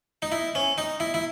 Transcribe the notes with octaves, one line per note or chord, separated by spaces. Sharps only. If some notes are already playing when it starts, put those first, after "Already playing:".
D#4
E4
C#4
D#4
E4
E4